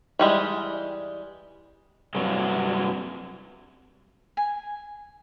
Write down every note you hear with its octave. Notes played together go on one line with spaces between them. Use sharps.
E3 G3 G#3
G2 C3 F#3
G#5